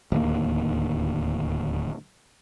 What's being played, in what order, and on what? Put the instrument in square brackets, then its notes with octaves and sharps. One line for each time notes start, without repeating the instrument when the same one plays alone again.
[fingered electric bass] D1 D#2 A#3